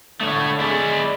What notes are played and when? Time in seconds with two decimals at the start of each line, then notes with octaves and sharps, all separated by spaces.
0.21 D3 A3 C#5
0.60 G#3 E4 D5